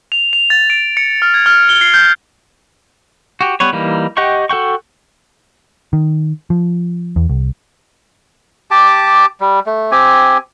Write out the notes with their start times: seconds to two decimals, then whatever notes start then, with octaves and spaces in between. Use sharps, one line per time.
0.12 F7
0.33 F7
0.50 A6
0.70 D7
0.97 C#7
1.22 F6
1.34 G#6
1.46 F6
1.69 G7
1.81 C7
1.94 G6
3.41 F#4 G4
3.60 G3 B3 B4 C#5
3.73 E3 G3 A#3 D#4
4.17 G4 D#5 F#5 G5 C#6
4.49 F#4 A4 F#5 G5 C#6
5.93 D#3
6.50 F3
7.16 E2
7.29 C2
8.71 G4 A5 D6
9.40 G3
9.66 A3
9.91 C4 G4 G#5